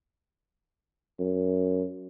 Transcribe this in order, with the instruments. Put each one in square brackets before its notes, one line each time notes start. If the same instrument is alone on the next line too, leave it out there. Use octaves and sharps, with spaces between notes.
[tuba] F#2